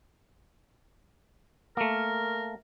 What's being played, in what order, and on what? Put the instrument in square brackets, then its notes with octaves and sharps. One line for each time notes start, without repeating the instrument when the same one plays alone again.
[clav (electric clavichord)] A3 A#3 [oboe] A#4